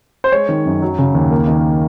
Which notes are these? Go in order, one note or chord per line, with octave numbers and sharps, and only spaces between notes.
C5
G#3 C#5
D#3
F#2
F#3
C#3
D#2
A#3
D#3